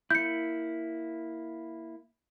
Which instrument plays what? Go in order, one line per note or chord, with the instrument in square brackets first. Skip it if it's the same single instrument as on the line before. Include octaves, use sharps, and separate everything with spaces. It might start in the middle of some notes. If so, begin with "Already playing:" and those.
[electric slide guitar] A#3 E4 [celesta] G6 C#7